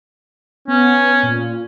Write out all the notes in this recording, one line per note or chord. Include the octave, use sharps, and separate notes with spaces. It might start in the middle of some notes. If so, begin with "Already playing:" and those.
B3 C#4
A#2